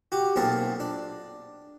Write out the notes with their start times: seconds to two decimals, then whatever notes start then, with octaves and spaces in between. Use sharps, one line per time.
0.12 F#4 G4
0.36 B1 A#2 C4 G#4 A#4 A5
0.80 D4